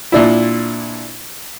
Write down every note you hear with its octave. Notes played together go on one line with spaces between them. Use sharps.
A#2 D4 E4